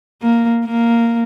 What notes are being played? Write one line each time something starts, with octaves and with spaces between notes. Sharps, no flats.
A#3
A#3